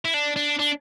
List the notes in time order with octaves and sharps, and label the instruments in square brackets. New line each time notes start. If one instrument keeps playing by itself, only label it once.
[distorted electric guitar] E4
D4
D4
D4